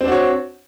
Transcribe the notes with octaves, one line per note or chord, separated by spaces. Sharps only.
C4 D4 F#4 C#5